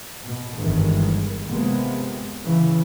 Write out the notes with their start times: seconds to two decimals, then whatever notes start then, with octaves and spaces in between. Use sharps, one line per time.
0.24 B2
0.56 G1 G2 D#3 E3 G#3
1.48 C3 F3 G#3 A#3 B3
2.44 C#3 E3